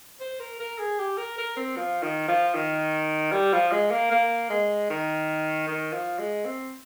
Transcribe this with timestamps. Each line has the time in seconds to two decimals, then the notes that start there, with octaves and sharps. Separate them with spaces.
0.20 C5
0.40 A#4
0.60 A#4
0.79 G#4
0.99 G4
1.17 A#4
1.38 A#4
1.57 C4
1.77 F3
2.03 D#3
2.28 F3
2.55 D#3
3.32 G3
3.53 F3
3.72 G#3
3.91 A#3
4.11 A#3
4.50 G#3
4.90 D#3
5.68 D#3
5.93 F3
6.19 G#3
6.45 C4